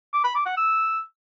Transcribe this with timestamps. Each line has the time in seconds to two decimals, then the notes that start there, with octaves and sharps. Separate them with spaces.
0.13 D6
0.24 B5
0.35 D6
0.46 F#5
0.57 E6